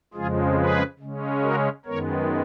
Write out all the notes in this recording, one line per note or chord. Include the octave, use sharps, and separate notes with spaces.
F2 C#3 F3 G#3 F4 G#4
G#4 B4
C#3 G#3 C#4
F#4 A#4
F#2 D#3 G#3 B3 A#4 C#5